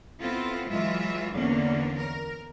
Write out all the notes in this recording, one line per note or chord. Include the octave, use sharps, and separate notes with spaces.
B3 C4 E4 F4 A4
E3 F#3 G#3 F4 E5
E2 D3 A#3 C#4 D4
A#4